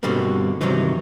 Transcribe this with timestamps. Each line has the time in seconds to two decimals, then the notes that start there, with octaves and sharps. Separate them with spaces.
0.03 G2 B2 D3 G3 A#3 C4
0.61 G2 C3 D#3 E3 F#3 D#4